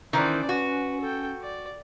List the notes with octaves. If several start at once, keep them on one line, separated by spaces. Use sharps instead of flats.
D#3 E3 C#4 C5 D5
F#4 B4
A4 G5
D5